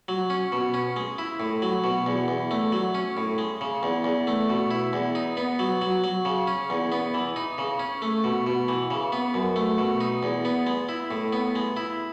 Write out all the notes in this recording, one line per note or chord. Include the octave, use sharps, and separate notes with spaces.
F#3
C#4
B2
C#4
G#3
E4
A2
F#3
B2
E2
E2
A3
F#3
C#4
A2
G#3
C#3
E2
E2
A3
B2
E4
E2
D#4
B3
F#3
F#3
F#3
C#3
C#4
E2
B3
E3
D#4
C#3
C#4
A3
B2
B2
E3
C#3
B3
F#2
A3
B2
D#4
E2
B3
G#3
E4
A2
B3
G#3
E4